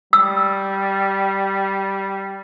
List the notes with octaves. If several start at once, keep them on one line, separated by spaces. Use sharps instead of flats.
G3 E6